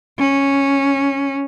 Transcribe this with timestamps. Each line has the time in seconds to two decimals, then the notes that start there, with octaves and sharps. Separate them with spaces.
0.18 C#4